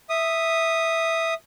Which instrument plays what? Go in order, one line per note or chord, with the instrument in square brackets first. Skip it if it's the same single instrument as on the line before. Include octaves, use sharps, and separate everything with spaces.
[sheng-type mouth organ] E5 D#6